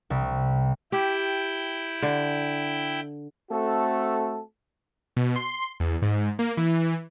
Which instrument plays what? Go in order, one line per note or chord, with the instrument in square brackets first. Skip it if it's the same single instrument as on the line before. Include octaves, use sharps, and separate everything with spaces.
[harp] C2
[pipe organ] E4 G5 [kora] G4
[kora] D3
[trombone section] A3 C4 F#4 A4
[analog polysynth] B2
C6
E2
G#2
A#3
E3